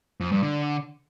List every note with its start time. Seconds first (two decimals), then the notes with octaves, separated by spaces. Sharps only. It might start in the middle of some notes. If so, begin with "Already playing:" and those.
0.20 F2
0.32 G2
0.43 D3